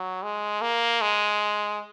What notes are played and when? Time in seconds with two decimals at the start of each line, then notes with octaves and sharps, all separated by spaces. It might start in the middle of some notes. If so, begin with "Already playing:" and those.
Already playing: F#3
0.23 G#3
0.62 A#3
1.01 G#3